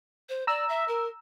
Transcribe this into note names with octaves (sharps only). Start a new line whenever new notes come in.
C5
D5 A#5 E6
E5
A#4